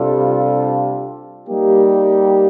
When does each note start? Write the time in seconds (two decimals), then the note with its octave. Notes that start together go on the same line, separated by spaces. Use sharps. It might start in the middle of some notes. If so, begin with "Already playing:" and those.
Already playing: C3 G3 D4 F4 A4
1.47 G3 A#3 D#4 G4